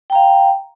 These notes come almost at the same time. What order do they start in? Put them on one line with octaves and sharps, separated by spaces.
G5 A#5 F5